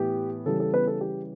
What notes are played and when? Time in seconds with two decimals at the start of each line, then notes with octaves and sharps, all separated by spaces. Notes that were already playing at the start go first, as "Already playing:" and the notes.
Already playing: A2 E3 B3 G4
0.46 C#3 E3 G3 A4
0.60 A4
0.73 B3 B4
0.87 A4
1.01 G4